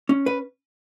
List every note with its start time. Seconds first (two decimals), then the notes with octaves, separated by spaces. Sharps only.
0.09 C#4
0.26 B4